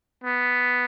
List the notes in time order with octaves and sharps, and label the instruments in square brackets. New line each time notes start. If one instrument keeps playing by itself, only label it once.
[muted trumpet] B3